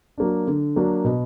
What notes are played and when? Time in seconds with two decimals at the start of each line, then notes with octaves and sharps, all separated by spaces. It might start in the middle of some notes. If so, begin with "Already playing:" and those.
0.18 F#3 A#3 D4
0.47 D3
0.76 F#3 A#3 D4
1.05 B2